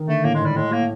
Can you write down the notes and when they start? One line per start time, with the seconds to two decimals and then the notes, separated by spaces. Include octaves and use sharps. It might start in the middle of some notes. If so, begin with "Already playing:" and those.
Already playing: D#3
0.08 D3 A3
0.24 A2 A#3
0.35 G#3
0.40 G#2 G3
0.56 A2 G#3
0.72 A2 A#3